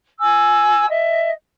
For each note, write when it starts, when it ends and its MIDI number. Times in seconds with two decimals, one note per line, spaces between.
0.20 0.89 80
0.20 0.89 88
0.89 1.31 75
0.89 1.31 76